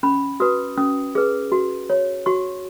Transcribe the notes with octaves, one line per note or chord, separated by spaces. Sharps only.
C#4 B5
F#4 B4 D#6
C#4 D#6
G#4 B4
F#4
C#5
F#4 C#6